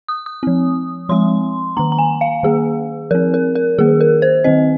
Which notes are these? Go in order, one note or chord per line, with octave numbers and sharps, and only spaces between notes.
D#6
D#6
F3 C4
F3 G#3 C4 C6
D#3 A#3 A#5
A#5
G#5
F5
D#3 A#3 G#4
F3 C4 A#4
A#4
A#4
D#3 A#3 G#4
A#4
C5
D#3 C4 D#5